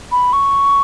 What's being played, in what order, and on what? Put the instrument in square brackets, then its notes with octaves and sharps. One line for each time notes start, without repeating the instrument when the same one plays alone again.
[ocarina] B5
C#6